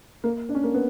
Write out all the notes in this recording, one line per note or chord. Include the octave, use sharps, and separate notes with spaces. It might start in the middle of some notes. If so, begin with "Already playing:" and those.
A#3
D4
C#4
A#3
B3